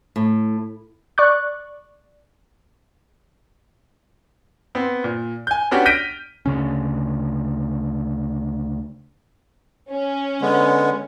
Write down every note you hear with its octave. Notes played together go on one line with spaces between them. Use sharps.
A2
D5 C#6 F#6
B3 C4
A#2
G#5 G6
B3 C#4 D4 F#4 G4
F6 G6 A#6 B6 D7 D#7
D2 C#3 C#4
C#4
D3 G#3 B3